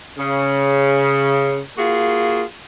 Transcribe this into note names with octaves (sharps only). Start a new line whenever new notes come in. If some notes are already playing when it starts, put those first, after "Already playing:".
C#3
A#3 F4 F#4 G#4